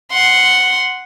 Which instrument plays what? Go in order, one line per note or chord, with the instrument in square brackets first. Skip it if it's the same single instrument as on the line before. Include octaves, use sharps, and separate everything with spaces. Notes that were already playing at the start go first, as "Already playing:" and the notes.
[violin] F#5 C6